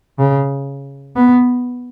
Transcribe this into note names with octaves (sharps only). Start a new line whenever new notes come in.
C#3
B3